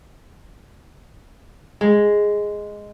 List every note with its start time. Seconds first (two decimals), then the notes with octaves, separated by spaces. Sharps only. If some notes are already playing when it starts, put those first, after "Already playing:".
1.81 G#3